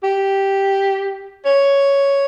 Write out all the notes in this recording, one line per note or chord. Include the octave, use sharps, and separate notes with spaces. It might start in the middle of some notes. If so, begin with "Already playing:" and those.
G4
C#5